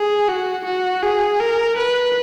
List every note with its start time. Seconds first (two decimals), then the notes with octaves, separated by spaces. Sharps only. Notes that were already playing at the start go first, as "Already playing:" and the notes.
Already playing: G#4
0.28 F#4
0.65 F#4
1.03 G#4
1.40 A#4
1.77 B4